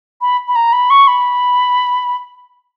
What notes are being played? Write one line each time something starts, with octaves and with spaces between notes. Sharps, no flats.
B5
B5
A#5
B5
C#6
B5